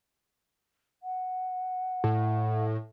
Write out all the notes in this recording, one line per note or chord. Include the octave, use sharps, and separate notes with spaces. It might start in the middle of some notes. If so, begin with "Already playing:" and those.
F#5
A2